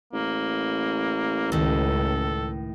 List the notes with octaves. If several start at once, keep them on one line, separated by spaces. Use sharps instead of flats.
A1 A#3
C#2 A2 D#3 A4